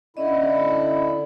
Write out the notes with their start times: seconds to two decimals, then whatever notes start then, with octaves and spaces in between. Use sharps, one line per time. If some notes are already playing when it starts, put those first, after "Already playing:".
0.17 D3 C#4 E4 D5 D#5